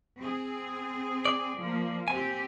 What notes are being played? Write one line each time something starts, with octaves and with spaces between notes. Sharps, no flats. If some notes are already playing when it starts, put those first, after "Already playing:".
C4 G#4
D5
F3 A#3
C4 G4 G#5